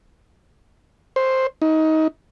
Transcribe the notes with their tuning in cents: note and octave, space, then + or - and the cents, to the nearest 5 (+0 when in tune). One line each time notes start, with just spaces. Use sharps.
C5 +5
D#4 +20